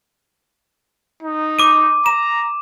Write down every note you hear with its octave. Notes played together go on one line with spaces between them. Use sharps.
D#4
D6 D#7
A#5 E7